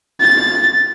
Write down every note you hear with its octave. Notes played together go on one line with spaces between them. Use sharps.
A6